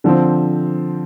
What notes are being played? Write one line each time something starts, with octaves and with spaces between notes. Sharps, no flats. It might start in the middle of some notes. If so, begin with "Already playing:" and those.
D3 F3 C4